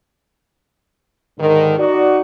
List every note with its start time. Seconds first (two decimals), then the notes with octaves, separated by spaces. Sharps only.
1.39 G#2 D3 D#3
1.79 D#4 F#4 D5